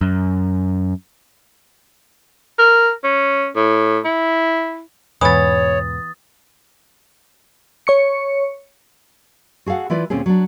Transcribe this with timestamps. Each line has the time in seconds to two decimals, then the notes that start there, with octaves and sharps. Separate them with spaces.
0.01 F#2
2.58 A#4
3.04 C#4
3.56 A2
4.05 E4
5.21 E2 G#2 B2 E3 B3 C#5 D#6 A6
7.87 C#5 C#6 C#7
9.66 F#4 G#4 A4 F5 F#5
9.90 E3 E4 F4 B4 D5
10.10 D2 A#2 C4 C#4 G#4
10.26 F#3 D4